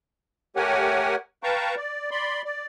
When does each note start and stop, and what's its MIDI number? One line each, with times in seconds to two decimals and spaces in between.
0.56 1.16 57
0.56 1.16 67
0.56 1.16 70
0.56 1.16 73
0.56 1.16 78
0.56 1.16 80
1.43 1.75 71
1.43 1.75 77
1.43 1.75 79
1.43 1.75 81
1.43 1.75 82
1.43 1.75 85
1.77 2.11 74
2.11 2.42 74
2.11 2.42 83
2.11 2.42 84
2.45 2.66 74